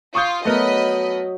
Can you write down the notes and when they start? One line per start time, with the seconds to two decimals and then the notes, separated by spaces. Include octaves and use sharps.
0.15 F4 C#6 D#6 G6
0.45 F#3 A3 B3 A#4 D#5 B5